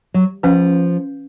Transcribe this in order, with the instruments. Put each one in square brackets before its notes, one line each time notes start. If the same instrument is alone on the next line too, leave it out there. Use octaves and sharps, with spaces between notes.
[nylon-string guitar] F#3
[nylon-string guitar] F3 [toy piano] C#4 F4 B4 F5